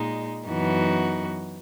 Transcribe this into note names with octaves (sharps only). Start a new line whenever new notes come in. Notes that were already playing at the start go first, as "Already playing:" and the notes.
Already playing: A#2 G#3 D#4
F#2 E3 B3 D#4 F#4